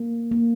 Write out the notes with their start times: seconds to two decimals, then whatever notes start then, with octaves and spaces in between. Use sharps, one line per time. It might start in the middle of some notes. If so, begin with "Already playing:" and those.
Already playing: A#3
0.32 A#3